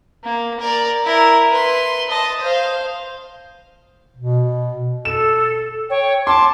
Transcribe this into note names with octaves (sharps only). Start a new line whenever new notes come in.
A#3
A#4 D5
E4 A#4
B4 C6
D#5 A5
C5 F5
B2
A4 E7
C#5 G5
A5 C6 D6